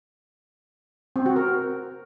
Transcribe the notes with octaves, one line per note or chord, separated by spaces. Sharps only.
C4
F#4
A#4